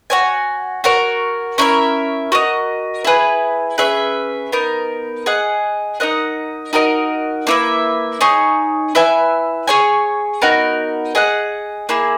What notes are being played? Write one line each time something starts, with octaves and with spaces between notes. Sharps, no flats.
F#4 C#5 G#5
F#4 A#4 C#5
C#4 E4 A#4 E5
F#4 A#4 D#5
E4 G#4 B4
C#4 G#4 B4 E5
B3 D#4 A#4
G#4 D#5 F#5
D#4 A#4 D#5 F#5
D#4 F#4 A#4 D#5
A#3 E4 B4 E5
D#4 G#4 C#5
E4 B4 E5 G#5
G#4 C#5 G#5
B3 D#4 F#4 A#4
G#4 D#5 F#5
A#3 E4 G#4